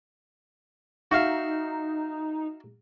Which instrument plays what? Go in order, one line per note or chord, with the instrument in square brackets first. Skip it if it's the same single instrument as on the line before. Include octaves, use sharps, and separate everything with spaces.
[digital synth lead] D#4 [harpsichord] F#4 E5 F5